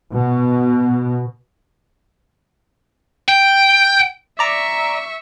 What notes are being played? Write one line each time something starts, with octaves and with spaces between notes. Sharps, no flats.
B2
G5
D5 E5 A#5 C#6 D6